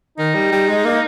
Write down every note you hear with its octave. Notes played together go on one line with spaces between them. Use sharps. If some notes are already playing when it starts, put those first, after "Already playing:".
D#3 D#4
G3
G3
G#3
A#3